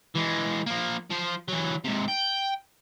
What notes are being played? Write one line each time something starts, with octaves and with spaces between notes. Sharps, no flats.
E3 G#3
F3 A#3
F3 C5
E3 F#3
G#2 C3
G5